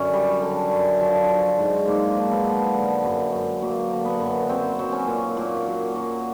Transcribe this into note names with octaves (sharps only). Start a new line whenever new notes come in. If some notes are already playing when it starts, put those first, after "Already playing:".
Already playing: F#2 D3 C#4
G3
D3
F#2
F3
F3
G#2
G#2 A#3
F3
B3
F3
D3
F#2
F#2
F#3 A#3
D3
B3
F#2
F#3 C4
F#3
C#4
A#2
A#2
F#3
F#3